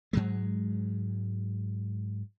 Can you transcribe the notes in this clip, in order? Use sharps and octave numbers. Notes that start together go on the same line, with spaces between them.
G#2 F#3 G#3